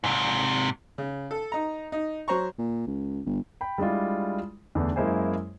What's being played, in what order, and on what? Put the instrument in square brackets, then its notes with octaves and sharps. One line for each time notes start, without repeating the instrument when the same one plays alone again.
[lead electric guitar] G#2 C3
[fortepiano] C#3
A4
D#4 A#5
D#4
F#3 C5 A#5 C#6
[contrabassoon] A#2
C#2
G1
[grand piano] G5 B5
G3 G#3 D4 E4 F4
E2 D3 A3 B3
F#2 G#3 A#3 E4 C5 G#5